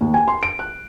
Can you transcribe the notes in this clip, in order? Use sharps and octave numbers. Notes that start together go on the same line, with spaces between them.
D#2
G#5
C6
D7
F#6